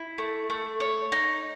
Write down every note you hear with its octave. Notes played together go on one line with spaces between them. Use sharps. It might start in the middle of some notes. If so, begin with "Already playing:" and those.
Already playing: E4
A3
A3
C#5
D#4